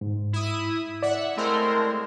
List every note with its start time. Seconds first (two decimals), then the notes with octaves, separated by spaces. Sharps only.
0.01 G#2
0.33 E4 D#6
1.03 D5 E5 F#5
1.37 G#3 A3 C4 E4 A#4 C5